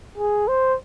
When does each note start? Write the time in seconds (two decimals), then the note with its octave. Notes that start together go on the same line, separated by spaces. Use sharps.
0.18 G#4
0.48 C5